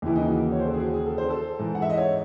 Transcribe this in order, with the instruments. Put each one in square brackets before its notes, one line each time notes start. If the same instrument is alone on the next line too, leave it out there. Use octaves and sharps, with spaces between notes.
[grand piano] D#2 C#3 E3 E4
D#4
F#4
C#5
C5
A4
G#4
F#4
G#4
A4
C5
A4
G#2 E3
F#5
E5
D#5
C#5